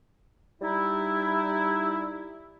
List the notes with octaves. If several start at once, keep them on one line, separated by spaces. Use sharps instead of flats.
G3 D#4 E4